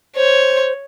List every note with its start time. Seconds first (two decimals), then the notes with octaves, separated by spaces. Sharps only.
0.16 C5 C#5